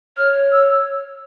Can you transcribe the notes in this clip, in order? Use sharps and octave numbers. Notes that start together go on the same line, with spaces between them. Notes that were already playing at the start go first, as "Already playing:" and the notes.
C#5 F6
E6